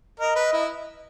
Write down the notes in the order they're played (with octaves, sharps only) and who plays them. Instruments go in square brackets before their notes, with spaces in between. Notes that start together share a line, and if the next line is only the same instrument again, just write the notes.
[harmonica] A#4 [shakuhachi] D#5
[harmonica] B4
E4